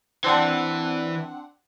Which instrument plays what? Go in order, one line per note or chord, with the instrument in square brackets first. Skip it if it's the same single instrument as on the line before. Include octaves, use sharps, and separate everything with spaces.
[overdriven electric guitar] E3 [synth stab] C4 D4 F#5